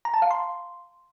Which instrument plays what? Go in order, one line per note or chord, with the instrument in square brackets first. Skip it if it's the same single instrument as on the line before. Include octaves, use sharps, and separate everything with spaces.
[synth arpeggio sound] A#5
A5
F5
C6